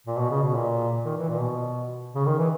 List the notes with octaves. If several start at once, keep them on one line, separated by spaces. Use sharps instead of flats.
A#2
B2
C#3
B2
A#2
D#3
E3
A#2
B2
C#3
D#3
E3